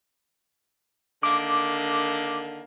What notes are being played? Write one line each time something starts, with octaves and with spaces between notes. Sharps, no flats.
D3 D#3 A#3 D6